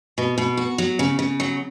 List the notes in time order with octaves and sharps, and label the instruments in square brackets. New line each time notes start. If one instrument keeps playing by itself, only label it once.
[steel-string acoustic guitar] B2
B2
F#4
F#3
C#3
C#3
F#3